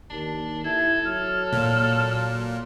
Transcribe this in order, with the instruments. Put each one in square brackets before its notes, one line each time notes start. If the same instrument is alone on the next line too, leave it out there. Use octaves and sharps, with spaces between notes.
[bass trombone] D#2 [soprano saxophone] D4
[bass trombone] E4 [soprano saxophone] A4 [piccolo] G#6
[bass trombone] F#3 [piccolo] F6
[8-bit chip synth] A#2